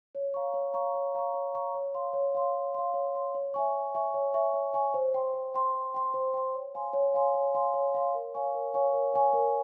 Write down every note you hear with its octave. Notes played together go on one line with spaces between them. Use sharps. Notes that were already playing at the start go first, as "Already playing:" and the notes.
C#5
F5 A#5 C#6
C#5
F5 A#5 C#6
C#5
F5 A#5 C#6
C#5
F5 A#5 C#6
C#5
F5 C6
C#5
F5 C6
C#5
F5 C6
C#5
F5 C6
C#5
E5 G#5 C#6
C#5
E5 G#5 C#6
C#5
E5 G#5 C#6
C#5
E5 G#5 C#6
C5
G5 C6
C5
G5 C6
C5
G5 C6
C5
G5 C6
C#5
F5 G#5 C6
C#5
F5 G#5 C6
C#5
F5 G#5 C6
C#5
F5 G#5 C6
A#4
C#5 F5 G#5 C#6
A#4
C#5 F5 G#5 C#6
A#4
C#5 F5 G#5 C#6
A#4